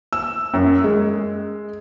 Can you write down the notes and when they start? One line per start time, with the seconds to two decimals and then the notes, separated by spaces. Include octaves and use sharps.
0.13 E6
0.54 F#2
0.84 G#3